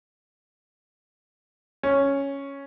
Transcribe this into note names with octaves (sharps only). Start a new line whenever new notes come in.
C#4